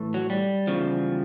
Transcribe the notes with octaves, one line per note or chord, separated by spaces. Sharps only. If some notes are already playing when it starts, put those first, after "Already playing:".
Already playing: A2 E3
F#3
G3
E2 C#3 F3